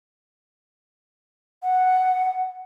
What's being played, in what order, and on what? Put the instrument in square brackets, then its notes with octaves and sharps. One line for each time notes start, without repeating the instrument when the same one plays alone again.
[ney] F#5